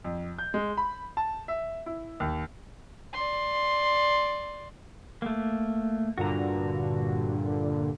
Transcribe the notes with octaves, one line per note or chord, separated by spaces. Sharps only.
F2
G6
G#3
B5
A5
E5
E4
D#2
D5 C6
A3 A#3
G2 A#2 D3 F#4 A#5